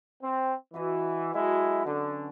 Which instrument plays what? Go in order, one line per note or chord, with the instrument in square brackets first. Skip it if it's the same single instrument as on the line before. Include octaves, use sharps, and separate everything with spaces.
[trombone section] C4
[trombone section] E3 [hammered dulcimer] F#4 B4 D#5
[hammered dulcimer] F#3 A4 [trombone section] G#3 E4
[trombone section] D3 [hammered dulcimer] C#4 D4 D6